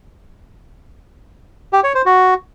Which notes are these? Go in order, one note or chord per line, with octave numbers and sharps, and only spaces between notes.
G4
C#5
C5
F#4